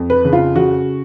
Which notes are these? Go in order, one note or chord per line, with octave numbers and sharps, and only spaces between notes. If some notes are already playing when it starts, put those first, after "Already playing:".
Already playing: F2
B4
C#3
F4
C#3 F#4